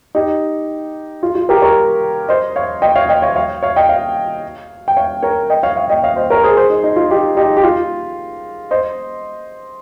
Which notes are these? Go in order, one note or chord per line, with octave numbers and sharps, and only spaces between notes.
D#4 G4
F4
F4
G4 A#4
A#4 C#5
C5 D#5
C#5 F5
D#5 G5
C#5 F5
D#5 G5
C#5 F5
C#5 F5
C#5 F5
D#5 G5
C#5 F5
G5
C#5 F5
A#4 C#5
D#5 G5
C#5 F5
C#5 F5
D#5 G5
C#5 F5
C5 D#5
A#4 C#5
G#4 C5
G#4 C5
D#4
D#4
F4
D#4 G4
D#4 G4
G4
F4
C5 D#5